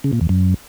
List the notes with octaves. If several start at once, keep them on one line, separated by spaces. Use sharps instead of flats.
C#3
A#2
E2
F#2